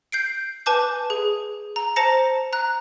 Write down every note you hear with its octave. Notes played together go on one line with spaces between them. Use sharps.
G6 C7 D7
B4 G#5 A5 D6 G6
G#4
A#5
C5 A5 A#5 A#6 C#7
A#5 F#6